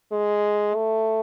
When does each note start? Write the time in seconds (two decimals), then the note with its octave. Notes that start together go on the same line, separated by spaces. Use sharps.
0.11 G#3
0.75 A3